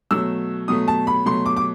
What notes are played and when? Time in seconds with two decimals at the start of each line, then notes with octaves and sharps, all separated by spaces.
0.11 B2 F#3 A3 E6
0.68 B2 F#3 A3 D#6
0.88 A5
1.07 B5
1.26 B2 F#3 A3 C6
1.46 D6
1.56 D6